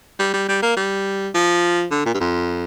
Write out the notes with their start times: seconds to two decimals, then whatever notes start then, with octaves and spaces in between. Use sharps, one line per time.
0.19 G3
0.34 G3
0.49 G3
0.62 A#3
0.77 G3
1.34 F3
1.91 D3
2.06 A#2
2.14 G2
2.20 F2